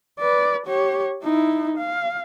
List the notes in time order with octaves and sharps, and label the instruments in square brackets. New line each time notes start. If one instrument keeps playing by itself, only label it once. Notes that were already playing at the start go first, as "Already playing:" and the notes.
[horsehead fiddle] B4 D5
G4 C#5
D#4 E4
F5